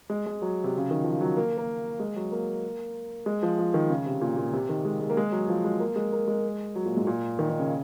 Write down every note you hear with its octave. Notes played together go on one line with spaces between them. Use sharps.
G#3
G#3
F#3
C3
C#3
D#3
F3
F#3
A#3
A#3
G#3
F#3
A#3
G#3
F3
F3
D#3
C#3
C3
A#2
A#2
C3
D#3
G#3
G#3
A#3
G#3
F#3
F3
G#3
A#3
G#3
A#3
G#3
F#3
A#2
G#2
A#2
D#3
D#3
C#3